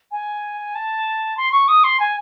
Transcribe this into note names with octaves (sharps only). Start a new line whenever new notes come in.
G#5
A5
C6
C#6
D#6
C6
G#5